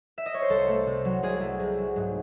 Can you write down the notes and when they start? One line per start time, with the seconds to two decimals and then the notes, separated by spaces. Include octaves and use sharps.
0.18 E5
0.26 D#5
0.34 C#5
0.42 C5
0.50 C2 A4
0.68 A3
0.87 C3
1.05 F#3
1.23 C2 G#4
1.41 A3
1.59 C3
1.78 F#3
1.96 G#2